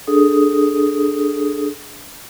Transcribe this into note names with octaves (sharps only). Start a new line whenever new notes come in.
D4 G#4 A4 D#6